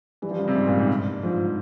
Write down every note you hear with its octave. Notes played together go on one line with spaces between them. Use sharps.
E3 G3
F3
C#3
C3
G#2
A#2
G#2
G2
G#2 F3